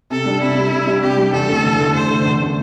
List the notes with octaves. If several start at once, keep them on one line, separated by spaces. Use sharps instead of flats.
C3 A4
G3 D4
C3 E4
G3 D4
C3
G3 D4
C3 G4
G3 D4
E2 A4
D3 A3
E2
D3 A3
E2 C5
D3 A3
E2
D3 A3